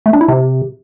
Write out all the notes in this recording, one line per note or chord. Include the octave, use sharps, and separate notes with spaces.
A3
D4
E4
C3